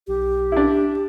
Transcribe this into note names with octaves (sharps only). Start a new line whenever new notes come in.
B1 G4
D4 E4